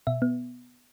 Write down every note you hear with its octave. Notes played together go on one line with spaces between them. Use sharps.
B2 E5
B3